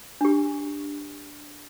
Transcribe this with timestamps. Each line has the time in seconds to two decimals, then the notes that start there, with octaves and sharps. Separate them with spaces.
0.21 D4 G4